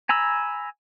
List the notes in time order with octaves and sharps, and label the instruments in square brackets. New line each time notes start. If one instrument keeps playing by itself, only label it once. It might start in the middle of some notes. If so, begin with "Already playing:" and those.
[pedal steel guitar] G#5 A#5 B5 E6